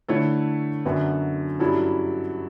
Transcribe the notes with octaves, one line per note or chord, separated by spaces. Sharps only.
D3 A3 E4 A4 C#5
F#2 D3 F#3 B3
G2 F#3 C#4 E4 A4